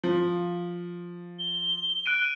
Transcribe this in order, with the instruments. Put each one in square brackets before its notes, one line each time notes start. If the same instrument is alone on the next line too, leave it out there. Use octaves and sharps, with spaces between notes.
[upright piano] F3
[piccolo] G7
[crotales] F#6 D7 D#7